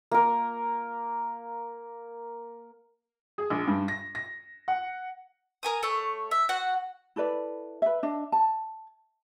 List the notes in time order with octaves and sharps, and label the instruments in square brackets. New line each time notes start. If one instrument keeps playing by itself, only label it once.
[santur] A#3 A#4
[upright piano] G#4
A#1
G2
A#6
A#6
F#5
[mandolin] A#4 G#5 D#6
A3 C#5
E5
F#4 F#5
[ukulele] E4 A4 B4 D5
B4 E5
D4 D#5 E5
A5